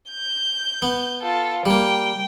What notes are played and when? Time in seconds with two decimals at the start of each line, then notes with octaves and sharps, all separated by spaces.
0.11 G6
0.82 B3
1.22 F4 A4
1.66 G3 A#3 G5